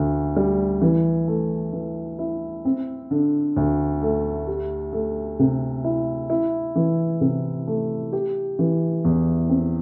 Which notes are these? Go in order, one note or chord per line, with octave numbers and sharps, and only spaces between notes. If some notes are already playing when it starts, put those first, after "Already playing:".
Already playing: D2 D3
G3
E3
A3
E3
E4
C4
D3
D2
A3
G4
A3
C3
E4
E4
E3
C3
A3
G4
E3
E2
C4